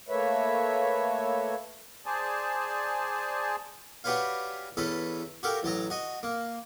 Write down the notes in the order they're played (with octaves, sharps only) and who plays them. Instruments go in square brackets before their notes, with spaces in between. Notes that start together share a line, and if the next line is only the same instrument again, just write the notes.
[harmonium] A3 A#3 B4 C#5 E5
[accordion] G#4 C5 D5 G#5 A5
[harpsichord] D4 F#4 G4 B4 C#5 F5
E2 C#4 A4 B4
F#4 G4 A4 A#4 F5 G5
A1 F#3 A5 A#5
F#4 D#5
A#3